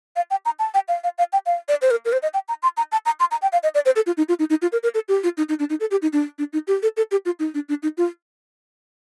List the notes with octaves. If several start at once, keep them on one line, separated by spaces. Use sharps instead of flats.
F5
G5
A#5
A5
G5
F5
F5
F5
G5
F5
D5
C5
A#4
A#4
C5
D#5
G5
A#5
C6
A#5
A5
A#5
C6
A#5
G5
F5
D#5
D5
C5
A4
F4
D#4
F4
D#4
D#4
F4
A#4
A#4
A4
G4
F4
D#4
D#4
D4
D#4
A4
G4
D#4
D4
D4
D#4
G4
A4
A4
G4
F4
D#4
D4
D4
D#4
F4